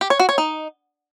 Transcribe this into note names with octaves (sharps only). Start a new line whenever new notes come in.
G4
C#5
F#4
C#5
D#4